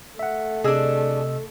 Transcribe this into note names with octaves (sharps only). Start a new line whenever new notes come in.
A3 E5 F#5
C3 D4 G#4 D#5 E6